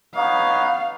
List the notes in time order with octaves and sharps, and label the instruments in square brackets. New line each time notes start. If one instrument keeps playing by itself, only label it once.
[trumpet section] B3 D#4 C#5 [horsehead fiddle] F5